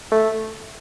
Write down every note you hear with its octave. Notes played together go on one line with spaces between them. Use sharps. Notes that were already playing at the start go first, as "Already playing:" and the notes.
A3